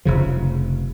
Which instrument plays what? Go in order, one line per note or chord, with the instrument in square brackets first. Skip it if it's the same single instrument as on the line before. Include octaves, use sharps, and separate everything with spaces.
[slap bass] F1 C#3 F3